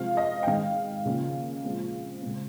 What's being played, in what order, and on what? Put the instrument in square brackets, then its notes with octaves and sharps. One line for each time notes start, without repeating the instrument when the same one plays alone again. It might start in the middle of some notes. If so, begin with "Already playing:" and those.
Already playing: [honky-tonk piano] C3 F3 G#3 C4 F5
D#5
G5
G#2 D#3 G#3 F5
C#3 F3 A#3 C#4
A#2 F3 G#3 C4
C#3 G#3 C4